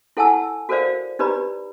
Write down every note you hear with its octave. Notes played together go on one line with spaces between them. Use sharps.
E4 A4 F#5 G#5 A5 E6
F#4 A4 A#4 C5 D5 F5
D#4 G4 B4 D5 A#5 B5